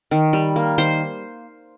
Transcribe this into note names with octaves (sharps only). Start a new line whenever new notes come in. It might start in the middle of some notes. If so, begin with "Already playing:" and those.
D#3
G3
A#3
D#3 C5